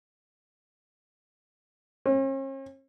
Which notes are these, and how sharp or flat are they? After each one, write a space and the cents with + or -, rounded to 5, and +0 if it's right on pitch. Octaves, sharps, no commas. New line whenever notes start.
C#4 -45